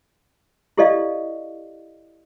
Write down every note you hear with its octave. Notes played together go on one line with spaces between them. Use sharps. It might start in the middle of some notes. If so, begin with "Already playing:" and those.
E4 G4 A4 D5 D#5 F5